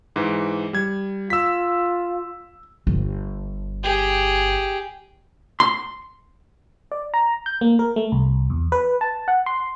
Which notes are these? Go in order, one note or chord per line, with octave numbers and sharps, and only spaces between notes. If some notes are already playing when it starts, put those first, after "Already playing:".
G#2 E3
G3 G#6
F4 E6 B6
G1
G4 G#4
C6
D5
A#5
G6
A#3
A#4
A3
C2
E2
B4
A5
F#5
C6